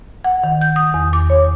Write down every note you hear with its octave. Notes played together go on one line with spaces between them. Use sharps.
F#5
D#3
G6
D#6
E2
D6
C#5